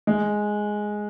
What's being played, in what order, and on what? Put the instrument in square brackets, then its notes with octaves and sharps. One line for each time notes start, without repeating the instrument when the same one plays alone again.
[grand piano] G#3